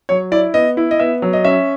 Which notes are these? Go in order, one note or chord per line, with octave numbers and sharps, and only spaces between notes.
F#3 C#5
E4 D5
B3 D#5
E4
D#5
B3 E5
F#3
D#5
C#4 E5